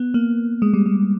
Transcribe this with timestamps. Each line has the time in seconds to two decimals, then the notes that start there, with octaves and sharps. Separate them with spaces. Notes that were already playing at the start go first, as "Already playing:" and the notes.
Already playing: B3
0.14 A#3
0.62 G#3
0.74 G3
0.86 G#3